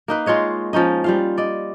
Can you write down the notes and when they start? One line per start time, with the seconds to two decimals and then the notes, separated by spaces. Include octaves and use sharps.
0.08 A#3 D#4 B4
0.26 G#3 F4 C#5 D#5
0.73 F3 C#4 D#4 D#5
1.04 G3 F4 F5
1.38 D5 D#5